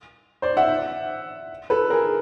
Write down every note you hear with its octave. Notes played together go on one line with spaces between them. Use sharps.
C5 D5
E5 F#5
A4 B4
G#4 A#4